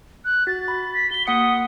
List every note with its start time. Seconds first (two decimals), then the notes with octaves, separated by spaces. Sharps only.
0.25 F#6
0.47 F#4 A6
0.68 B5
0.94 B6
1.11 F#4 B6 G7
1.27 A#3 F#5 D#6 C#7